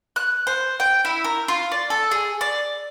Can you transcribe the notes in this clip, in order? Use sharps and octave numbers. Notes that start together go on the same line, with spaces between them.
F#6
C5
G5
E4
A#4
F4
D5
A4
G#4
D5